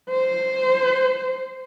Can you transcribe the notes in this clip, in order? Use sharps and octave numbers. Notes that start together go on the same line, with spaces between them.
C5